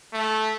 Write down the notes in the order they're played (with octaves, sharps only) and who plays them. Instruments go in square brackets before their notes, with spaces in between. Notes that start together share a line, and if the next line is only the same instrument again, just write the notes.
[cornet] A3